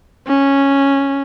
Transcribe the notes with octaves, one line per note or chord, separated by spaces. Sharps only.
C#4